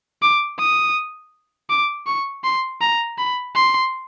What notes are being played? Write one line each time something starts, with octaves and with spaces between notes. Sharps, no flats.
D6
D#6
D6
C#6
C6
A#5
B5
C6